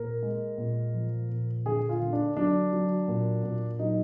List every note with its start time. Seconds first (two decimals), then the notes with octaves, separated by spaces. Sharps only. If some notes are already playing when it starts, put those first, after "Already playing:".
Already playing: A#2 A#4
0.22 G#3
0.58 A#2
0.94 F3
1.30 A#2
1.65 D3 G#4
1.89 F4
2.02 D3
2.13 D4
2.37 F#3 D4
2.72 F#3
3.08 A#2
3.44 A#2
3.79 F#3 D#4